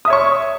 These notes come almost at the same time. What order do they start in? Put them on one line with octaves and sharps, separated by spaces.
D#6 E5 C#5 C#6